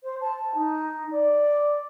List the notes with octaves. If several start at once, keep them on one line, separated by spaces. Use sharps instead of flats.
C5
A5
D#4
D5